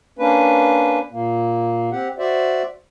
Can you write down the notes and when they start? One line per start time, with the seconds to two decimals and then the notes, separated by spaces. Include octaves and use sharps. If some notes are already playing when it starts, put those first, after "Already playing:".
0.19 A#3 C#4 D4 B4
1.12 A#2 A#3
1.92 C4 G4 F#5
2.18 F#4 C5 D5 E5